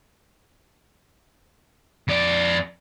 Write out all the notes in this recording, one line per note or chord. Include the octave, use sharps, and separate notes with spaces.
F2 D5